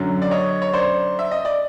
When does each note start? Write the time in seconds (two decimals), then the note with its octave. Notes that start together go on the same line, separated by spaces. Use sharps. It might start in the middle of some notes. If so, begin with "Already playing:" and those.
Already playing: F#2 D3 F#3
0.22 D5
0.31 C#5 D#5
0.62 C#5
0.73 C5 D5
1.19 E5
1.31 D#5
1.45 D5